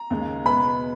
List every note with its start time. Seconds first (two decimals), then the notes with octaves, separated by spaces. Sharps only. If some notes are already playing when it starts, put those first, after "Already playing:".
Already playing: A#5
0.10 D#2 C#3 G#3
0.46 B2 G#3 B3 B5